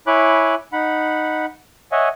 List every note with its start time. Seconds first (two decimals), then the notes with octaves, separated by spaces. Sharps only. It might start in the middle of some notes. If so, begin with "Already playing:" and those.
0.07 E4 C#5 G#5 B5 D6 F#6
0.73 D#4 F#5 B5
1.92 C#5 D#5 E5 F#5 G#5